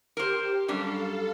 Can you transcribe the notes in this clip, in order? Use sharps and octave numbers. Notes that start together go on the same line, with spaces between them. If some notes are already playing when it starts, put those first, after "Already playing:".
G4 A#4 C5
F#2 G3 D4 A4 F5